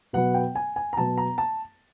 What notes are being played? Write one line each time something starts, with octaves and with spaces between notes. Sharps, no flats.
B2 F#3 B3 F#5
G5
G#5
G#5
A#5
B2 F#3 B3 A5
A#5
A5